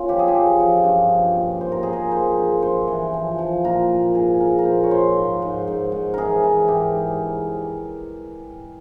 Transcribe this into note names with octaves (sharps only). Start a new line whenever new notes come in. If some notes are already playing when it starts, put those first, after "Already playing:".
Already playing: A#2 C#4 F4
F3 G4
G#4
G4
F3
F3
G2
F3
A#2
G#2 C5
A#4
F3 G#4
A#4
F3 C5
G2
G2 C5
E3
F3
F3
A#2 A#4
A#2
G#2 G#4
F3 A#4
A#4
A#2 C5
C#5
A#2 C5
G#2
G#2
G#2
G#2
E3 G#4 A#4
E3
G#2 G4
G#2
G2